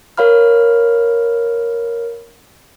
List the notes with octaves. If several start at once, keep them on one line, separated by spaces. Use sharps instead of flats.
A#4 C#5 F5 B5 F6